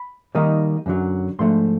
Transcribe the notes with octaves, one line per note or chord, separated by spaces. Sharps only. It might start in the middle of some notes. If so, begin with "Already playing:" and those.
Already playing: B5
D#3 G3 A#3 D#4
F#2 D3 F#3
G#2 F3 A3 D4 C6